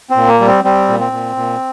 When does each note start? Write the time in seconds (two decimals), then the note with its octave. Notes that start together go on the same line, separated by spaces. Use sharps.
0.10 C4
0.16 A#2
0.28 A#3
0.40 G3
0.46 C4
0.64 G3 C4
0.88 A#2
1.00 C4
1.12 A#2
1.36 A#2